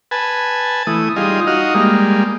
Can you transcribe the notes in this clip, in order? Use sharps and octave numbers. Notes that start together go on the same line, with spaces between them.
B4 G#5 A5
E3 A3 D#6
G3 D#4 F4 G#4 D#5
D#4 F#4 D#5 F5
G3 G#3 A#3